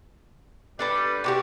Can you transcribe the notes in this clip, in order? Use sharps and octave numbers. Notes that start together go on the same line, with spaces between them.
G2 G3 D4 A4 B4
C3 F#4 G4 D6